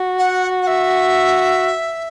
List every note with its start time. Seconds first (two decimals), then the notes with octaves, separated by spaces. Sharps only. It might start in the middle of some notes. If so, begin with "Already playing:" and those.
Already playing: F#4
0.18 F#5
0.62 F#5
0.67 E5